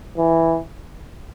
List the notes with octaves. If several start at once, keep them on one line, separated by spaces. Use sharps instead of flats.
E3